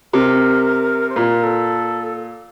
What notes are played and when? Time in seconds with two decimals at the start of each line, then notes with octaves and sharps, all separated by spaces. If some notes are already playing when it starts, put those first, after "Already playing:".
0.13 C3 A#4
1.09 C5
1.16 A#2 A#4
1.43 A4